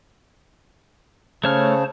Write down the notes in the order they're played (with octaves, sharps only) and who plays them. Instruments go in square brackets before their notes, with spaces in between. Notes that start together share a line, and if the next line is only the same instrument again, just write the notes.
[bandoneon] C#3 [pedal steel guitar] A3 C#5 F6 [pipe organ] C5 A5